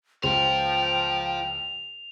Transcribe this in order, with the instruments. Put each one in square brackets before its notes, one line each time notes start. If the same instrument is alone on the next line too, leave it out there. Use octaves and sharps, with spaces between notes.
[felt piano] C#2 [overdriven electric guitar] F4 C5 [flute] G5 [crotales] F7